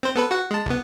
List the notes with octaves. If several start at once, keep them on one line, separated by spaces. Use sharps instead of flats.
C4 C5
B3 A4 B4
F#4 F#5
G#3 A5
C2 B3